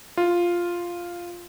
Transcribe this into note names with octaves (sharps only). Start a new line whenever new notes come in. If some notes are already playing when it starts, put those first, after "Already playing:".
F4